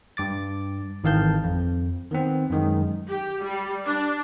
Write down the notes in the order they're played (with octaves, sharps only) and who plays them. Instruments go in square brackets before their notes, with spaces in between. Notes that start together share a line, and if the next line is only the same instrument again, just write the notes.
[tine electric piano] G2 D6 A6
G#1 D#3 E3 F5 A5 G6
F2
D#3 B3 C4
F#2 D#3 G#3
[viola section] G4
G3
D4